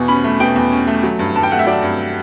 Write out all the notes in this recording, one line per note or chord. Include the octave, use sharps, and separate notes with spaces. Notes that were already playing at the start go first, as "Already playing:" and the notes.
Already playing: E2 B2 C#6
C#4 B5
A3
B2 G5
E2
C#4
A3
F#3
G2
G2 A5
G5
A3 F#5
E5
F#3 D5
G2